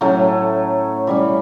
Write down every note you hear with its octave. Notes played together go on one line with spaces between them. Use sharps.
A2 F#3 A3 C#4
E3 G3 C#4